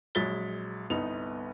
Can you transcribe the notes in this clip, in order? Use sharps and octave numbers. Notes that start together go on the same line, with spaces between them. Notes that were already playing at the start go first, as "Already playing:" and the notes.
A#1 F#3 G#3 A6 B6 G7
G1 C2 B3 D#4 F7